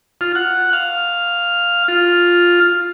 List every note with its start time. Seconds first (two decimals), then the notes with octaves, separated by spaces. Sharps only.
0.21 F4
0.35 F#5
0.73 F5
1.88 F4